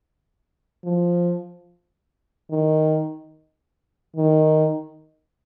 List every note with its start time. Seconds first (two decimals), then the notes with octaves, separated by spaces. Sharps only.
0.84 F3
2.50 D#3
4.16 D#3